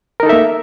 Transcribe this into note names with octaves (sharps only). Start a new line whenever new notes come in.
A#3 D#4 A4 A#4 E5